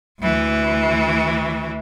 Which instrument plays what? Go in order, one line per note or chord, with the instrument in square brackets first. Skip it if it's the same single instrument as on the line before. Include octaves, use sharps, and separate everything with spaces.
[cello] D2 E3